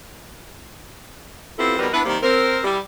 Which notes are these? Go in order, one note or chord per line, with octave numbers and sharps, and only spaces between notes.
B3 C4 E4 F4 G4 A4
F2 B2 G3 D#4 A#4 B4
B3 D4 E4 B4
C3 D#3 G3 A#3
C4 A#4
G3 E4 G4